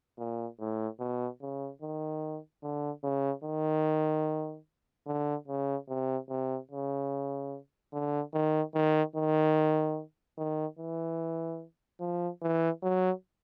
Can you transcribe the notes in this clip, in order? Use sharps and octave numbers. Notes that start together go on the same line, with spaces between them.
A#2
A2
B2
C#3
D#3
D3
C#3
D#3
D3
C#3
C3
C3
C#3
D3
D#3
D#3
D#3
D#3
E3
F3
E3
F#3